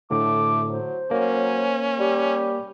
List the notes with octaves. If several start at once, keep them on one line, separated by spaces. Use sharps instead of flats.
A2 D3 A3 D6
F#3 C5
F#3 A#3 C#4
G3 G4